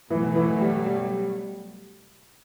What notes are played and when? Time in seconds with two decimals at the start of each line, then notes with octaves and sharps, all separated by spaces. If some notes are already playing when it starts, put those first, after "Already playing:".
0.10 B2 E3 F#3 A3
0.36 E3
0.61 G3
0.86 G3